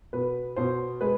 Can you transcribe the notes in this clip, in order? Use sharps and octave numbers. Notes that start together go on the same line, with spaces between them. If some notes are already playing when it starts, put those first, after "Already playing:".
B2 B4
B2 C5
G#3 B4